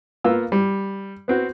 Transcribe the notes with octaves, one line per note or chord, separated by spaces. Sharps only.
A#3 B3 F4 E6
G3
B3 C4 F#4 C5